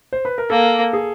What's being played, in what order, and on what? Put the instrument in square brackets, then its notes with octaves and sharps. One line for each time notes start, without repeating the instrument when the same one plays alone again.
[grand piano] C5
B4
A#4
[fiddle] A#3 [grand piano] A4
[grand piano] G#4